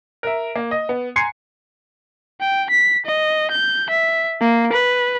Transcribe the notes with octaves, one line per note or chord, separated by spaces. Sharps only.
A#4 E5
A#3
D#5
B3
G#5 A#5 C6 G#6 C7 C#7
G5
B6
D#5
G6
E5
A#3
B4